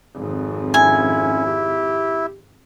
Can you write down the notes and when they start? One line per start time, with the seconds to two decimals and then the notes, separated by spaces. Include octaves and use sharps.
0.15 G#1 F2
0.74 C#4 E4 G#5
1.46 G4